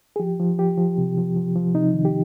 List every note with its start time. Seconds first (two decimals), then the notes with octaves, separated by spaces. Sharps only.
0.16 G#4
0.20 F3 G4
0.40 F3
0.59 F3 G4
0.78 F3
0.98 C3
1.18 F3
1.36 F3
1.55 F3
1.74 C3 D#4
1.94 D#3
2.05 G4